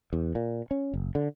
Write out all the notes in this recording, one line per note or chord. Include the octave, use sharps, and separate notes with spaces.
E2
A#2
C#4
F#1
D3